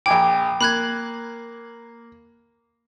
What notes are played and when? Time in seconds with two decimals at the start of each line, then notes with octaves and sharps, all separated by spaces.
0.06 A#1 G5 G#5 D6
0.61 A#3 B5 F#6 G#6